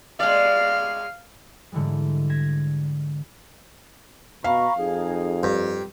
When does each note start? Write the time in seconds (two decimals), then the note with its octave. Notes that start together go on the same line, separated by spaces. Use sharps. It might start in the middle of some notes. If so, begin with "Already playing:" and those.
0.20 G#3 D5 F5
1.72 G#2 D3 E3 G3 G#3
2.29 G#6 A#6 B6 E7
4.44 B2 F5 A#5 B5 C#6
4.78 F2 D#4 G#4
5.43 G2